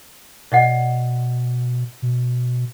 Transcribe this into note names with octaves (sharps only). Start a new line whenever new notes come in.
B2 D5 D#5 F#5
B2